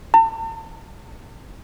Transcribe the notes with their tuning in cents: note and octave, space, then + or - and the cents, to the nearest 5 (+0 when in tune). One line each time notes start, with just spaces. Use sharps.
A5 +45